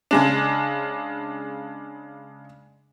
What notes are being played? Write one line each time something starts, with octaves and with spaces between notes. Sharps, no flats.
C#3 G#3 D4